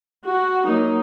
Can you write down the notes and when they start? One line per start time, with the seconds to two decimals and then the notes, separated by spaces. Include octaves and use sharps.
0.25 F#4
0.66 F#3 A#3 D#4